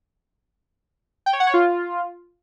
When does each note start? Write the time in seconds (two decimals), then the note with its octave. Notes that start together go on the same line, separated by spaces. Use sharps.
1.26 G5
1.33 C#5
1.40 F#5
1.47 C#5
1.54 F4